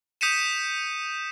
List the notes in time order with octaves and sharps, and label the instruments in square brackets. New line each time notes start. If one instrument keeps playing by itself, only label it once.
[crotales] D#6 G6 B6 C#7 D#7 E7